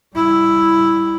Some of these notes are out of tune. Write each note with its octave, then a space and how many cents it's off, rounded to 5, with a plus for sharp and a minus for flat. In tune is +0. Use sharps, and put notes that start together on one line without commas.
G3 +0 E4 +0